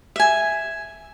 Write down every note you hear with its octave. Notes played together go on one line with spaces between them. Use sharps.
E5 G#5